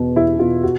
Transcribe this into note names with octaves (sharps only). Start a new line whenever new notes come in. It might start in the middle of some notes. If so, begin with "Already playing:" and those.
Already playing: E2 B2
E2 E4
B2 F4
F#4